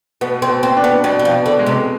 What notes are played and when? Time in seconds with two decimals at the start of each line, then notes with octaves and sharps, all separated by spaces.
0.21 B2 B3
0.42 C4
0.49 B2
0.63 C4
0.76 D4
0.84 B3
1.04 B2 G3
1.19 G3
1.25 F3
1.31 B2
1.46 D3
1.59 G#3
1.67 C3